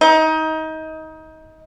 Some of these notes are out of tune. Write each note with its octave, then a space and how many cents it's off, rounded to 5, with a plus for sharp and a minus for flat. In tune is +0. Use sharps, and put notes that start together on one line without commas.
D#4 +25